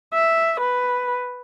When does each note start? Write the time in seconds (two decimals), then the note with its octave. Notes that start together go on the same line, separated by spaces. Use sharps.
0.14 E5
0.60 B4